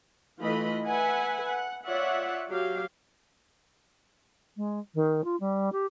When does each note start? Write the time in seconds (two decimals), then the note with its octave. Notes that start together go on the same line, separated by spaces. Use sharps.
0.41 E3 A3 F4 D#5 B5
0.86 B4 E5 F#5 G#5
1.47 F#5
1.86 F4 C#5 D5 E5 F#5
2.49 F#3 G4 F5
4.57 G#3
4.94 D#3
5.24 F4
5.40 G3
5.72 G4